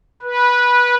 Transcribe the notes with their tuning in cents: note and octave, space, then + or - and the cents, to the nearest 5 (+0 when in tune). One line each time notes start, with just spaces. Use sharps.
B4 -15